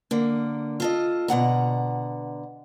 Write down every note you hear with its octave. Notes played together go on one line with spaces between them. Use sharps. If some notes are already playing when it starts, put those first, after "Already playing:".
D3 A#3
F4 A4 D#5
B2 D3 F#5 A#5